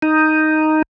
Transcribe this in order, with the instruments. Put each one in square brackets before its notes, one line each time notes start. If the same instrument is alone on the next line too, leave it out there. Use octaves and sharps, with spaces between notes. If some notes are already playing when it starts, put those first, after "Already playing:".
[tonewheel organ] D#4